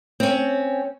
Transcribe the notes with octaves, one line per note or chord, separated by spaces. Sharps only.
C4 C#4